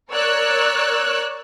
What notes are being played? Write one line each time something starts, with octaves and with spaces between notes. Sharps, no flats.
A#4 C#5 D5 E6 F#6